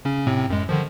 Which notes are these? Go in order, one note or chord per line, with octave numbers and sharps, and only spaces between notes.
C#3 C#4
A2 C3 C4
F#2 G#3
D3 D#3 F3